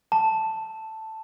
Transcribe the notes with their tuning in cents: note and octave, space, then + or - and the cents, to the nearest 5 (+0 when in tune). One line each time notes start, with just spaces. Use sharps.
A5 +5